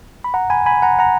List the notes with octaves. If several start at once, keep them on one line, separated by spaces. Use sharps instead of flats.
B5
F#5 A#5
G#5 B5
G#5 B5
F#5 A#5
F#5 A#5